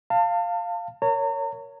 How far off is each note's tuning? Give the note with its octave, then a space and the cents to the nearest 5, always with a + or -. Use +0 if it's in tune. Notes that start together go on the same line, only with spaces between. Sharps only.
F5 +0 A5 +30
A#4 +0 C#5 +10 A#5 -40